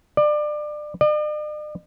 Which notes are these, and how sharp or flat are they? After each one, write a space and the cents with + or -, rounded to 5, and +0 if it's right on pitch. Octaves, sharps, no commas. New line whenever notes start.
D5 +25
D5 +45